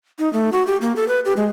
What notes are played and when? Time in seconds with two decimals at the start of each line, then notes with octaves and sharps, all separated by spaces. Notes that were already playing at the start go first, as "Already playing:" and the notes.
0.19 D#4
0.33 A3
0.52 F#4
0.67 G4
0.81 A#3
0.96 A4
1.08 B4
1.25 G4
1.37 G#3